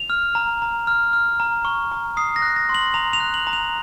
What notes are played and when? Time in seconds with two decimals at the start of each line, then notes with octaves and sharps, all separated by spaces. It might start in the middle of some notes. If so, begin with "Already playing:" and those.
Already playing: F7
0.10 F6
0.35 A#5
0.62 A#5
0.87 F6
1.13 F6
1.40 A#5
1.65 C#6
1.92 A#5
2.17 D#6 C7
2.36 A#6
2.42 F#6
2.56 A#6
2.69 C6
2.75 F#7
2.94 A#5 F7
3.13 F7
3.20 F#6
3.34 F#7
3.47 A#5
3.53 F7